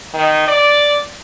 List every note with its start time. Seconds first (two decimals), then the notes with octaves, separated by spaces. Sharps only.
0.14 D#3
0.48 D5